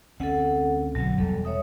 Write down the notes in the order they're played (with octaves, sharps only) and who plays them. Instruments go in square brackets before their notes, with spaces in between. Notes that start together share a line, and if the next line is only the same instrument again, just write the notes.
[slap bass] D2 C4 C#4 [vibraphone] A4 F#5
[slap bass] B1 B2 D3 [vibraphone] F#3
[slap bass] E1 [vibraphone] G3 A4
[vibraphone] C#5 E5 D#6